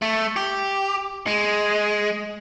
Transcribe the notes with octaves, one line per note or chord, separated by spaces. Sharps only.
A3
G4
G#3